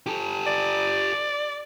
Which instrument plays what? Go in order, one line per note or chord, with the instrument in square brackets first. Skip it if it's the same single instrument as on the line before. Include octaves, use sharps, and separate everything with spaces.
[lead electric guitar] G4 A4
[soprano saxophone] D5